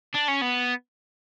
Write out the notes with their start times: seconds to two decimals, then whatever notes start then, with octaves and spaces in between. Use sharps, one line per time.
0.14 D4
0.28 C#4
0.41 B3